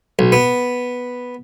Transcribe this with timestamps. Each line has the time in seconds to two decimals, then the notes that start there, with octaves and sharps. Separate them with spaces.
0.19 B1
0.32 B3